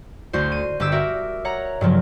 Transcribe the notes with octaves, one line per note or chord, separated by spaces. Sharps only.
D2 F#4 C5
D#7
G1 G2 G4 D6 E6
F#4 A#4 E5
C#5 F#5 A#5
G2 C#3 F3 F#3